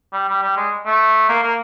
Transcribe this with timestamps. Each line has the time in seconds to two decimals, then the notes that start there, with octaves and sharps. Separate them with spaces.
0.13 G3
0.29 G3
0.42 G3
0.56 G#3
0.86 A3
1.29 A#3
1.42 A#3